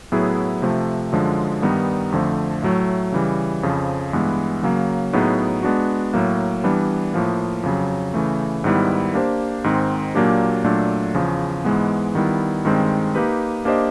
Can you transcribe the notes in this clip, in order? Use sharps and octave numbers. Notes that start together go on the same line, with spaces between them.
A2 F#3 B3 E4 G#4
C3 F3 A3
F#2 D3 F3 G#3
G2 D#3 G3 B3 D#4
F2 D3 F3 A3
A2 F#3 A3
C#3 E3 G3
F2 C#3 F3
G2 E3 G#3 B3
C#3 F#3 A#3
A2 F#3 B3 D#4 G#4
G#3 B3 D4 F#4
A2 F#3 A#3
E3 G3 B3 D4
A2 F3 A#3
F2 C#3 F#3
C#3 E3 A3
G#2 D#3 G3 B3 E4
A#3 D4 G4 C5
G#2 D#3 G#3 C4
A#2 F#3 A#3 D4 G4
A#2 F#3 A3 D4
E2 C#3 F3
G#2 E3 G#3 B3
D#3 G3 B3 E4
G2 D#3 G#3 C4
A#3 D#4 G4 B4
A#3 D4 G4 C5 D#5